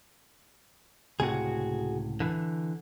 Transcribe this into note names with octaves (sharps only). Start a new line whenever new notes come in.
C#2 A2 C3 F#4 G#4
D3 E3